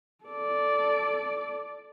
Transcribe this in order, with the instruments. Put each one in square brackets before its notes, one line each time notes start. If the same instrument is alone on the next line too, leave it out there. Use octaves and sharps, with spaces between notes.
[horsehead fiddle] A4 D5